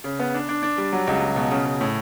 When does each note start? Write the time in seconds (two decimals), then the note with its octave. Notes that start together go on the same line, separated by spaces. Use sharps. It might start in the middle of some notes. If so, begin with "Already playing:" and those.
0.04 C#3
0.20 B3
0.34 D4
0.49 D4
0.63 D4
0.78 G3
0.93 F#3
1.07 C#2
1.21 F#3
1.36 B2
1.52 C#3
1.65 C#3
1.81 A2